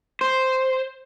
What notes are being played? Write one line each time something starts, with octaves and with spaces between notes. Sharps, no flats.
C5